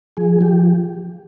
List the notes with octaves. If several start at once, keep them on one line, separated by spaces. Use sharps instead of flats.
F3 G#4
F3 G4